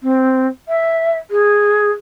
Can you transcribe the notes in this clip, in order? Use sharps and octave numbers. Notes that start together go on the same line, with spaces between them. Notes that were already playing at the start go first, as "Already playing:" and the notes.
C4
E5
G#4